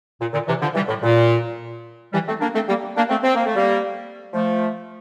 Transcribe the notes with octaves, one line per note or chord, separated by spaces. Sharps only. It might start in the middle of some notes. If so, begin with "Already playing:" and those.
A#2
A#2 D3
C3 E3
D3 F3
E3 G3
A2
A#2
E3 G3
A3 C4
A#3 D4
A3 C4
G3 A#3
A#3 D4
A3 C4
C4
A#3
A3
G3 A#3
F3 A3